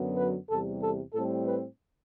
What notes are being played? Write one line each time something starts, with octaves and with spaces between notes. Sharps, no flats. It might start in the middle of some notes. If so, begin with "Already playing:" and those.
Already playing: F#2 D3 F#3 B3
B4
E2 C3 G3 A4
A4
A2 G3 C4 A4
B4